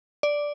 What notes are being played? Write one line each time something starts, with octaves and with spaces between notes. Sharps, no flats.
D5